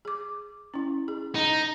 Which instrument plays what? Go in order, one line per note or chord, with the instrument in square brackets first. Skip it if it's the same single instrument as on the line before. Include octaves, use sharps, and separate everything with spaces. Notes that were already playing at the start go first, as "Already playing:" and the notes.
[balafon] G#4 D6
C#4 E4
G#4
[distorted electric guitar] D#4